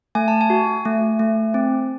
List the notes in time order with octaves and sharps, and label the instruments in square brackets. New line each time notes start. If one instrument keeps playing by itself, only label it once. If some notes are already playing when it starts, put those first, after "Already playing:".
[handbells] A3 G#5
A5
G#5
F#4
A3
A3
C4